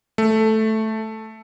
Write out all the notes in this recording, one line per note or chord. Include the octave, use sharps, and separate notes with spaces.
A3